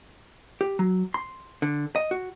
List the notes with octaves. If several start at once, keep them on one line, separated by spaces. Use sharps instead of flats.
G4
F#3
C6
D3
D#5
F#4